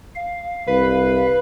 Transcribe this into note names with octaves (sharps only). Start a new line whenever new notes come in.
F5
C2 B4